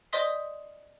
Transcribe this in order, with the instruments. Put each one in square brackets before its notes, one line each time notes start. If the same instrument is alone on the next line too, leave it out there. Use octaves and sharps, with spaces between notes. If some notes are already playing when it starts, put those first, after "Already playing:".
[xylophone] C5 D5 D#5 C6 D#6 B6